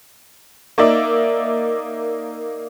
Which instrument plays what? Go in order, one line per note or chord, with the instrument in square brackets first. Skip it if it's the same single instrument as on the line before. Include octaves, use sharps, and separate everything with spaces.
[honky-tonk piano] A#3 D#4 D5 E5